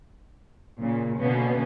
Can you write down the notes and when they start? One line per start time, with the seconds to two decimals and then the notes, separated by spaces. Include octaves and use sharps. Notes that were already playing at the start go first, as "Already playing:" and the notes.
0.79 A#2 C#3
1.19 B2 D3 A#3 B3 C#4